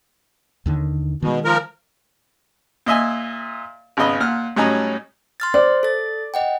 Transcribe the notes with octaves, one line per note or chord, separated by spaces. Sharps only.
D#2 D3 D#3
B2 D#3 G#3
F3 A#4
A#2 D#5 E5 G#5
G#1 C#3 B3 D#5 B5
A#2 F#5 F6
A2 F#3 G3 C#4 D#4 A#5
C6 F6 A6
C5 D5
A4 A6
D#5 F#5 G5